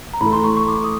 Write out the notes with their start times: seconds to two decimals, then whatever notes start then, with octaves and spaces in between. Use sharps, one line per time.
0.14 A#5
0.21 A2 E3 A3 B5
0.33 C6
0.44 C#6
0.57 C#6
0.68 D6
0.84 D#6